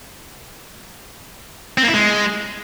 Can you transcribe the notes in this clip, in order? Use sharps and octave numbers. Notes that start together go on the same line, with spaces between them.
C4
A#3
E4
G#3